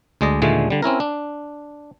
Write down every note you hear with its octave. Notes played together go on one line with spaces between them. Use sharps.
D2 G#3 D5 D#5
D#2 A#2 D3 G#3 A3
D3 G3
C4 C#4 E4 A#4
D4